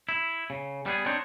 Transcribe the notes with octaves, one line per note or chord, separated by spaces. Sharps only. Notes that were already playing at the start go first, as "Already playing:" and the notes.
E4
C#3
G3 B3 G#4
C4 D4 D#4 C5 C#5